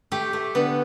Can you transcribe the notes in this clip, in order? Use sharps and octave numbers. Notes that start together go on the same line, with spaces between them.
A3 G4
A3
D3 B3